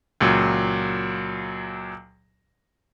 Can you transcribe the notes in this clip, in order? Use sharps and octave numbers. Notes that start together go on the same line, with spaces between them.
C#2 A#2 F#3